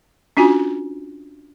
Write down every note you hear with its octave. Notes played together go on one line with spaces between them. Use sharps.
C#4 D4 F4 F#4 G#5